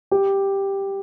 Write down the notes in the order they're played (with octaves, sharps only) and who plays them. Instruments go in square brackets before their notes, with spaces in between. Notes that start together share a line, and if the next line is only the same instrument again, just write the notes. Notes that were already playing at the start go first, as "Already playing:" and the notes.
[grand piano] G4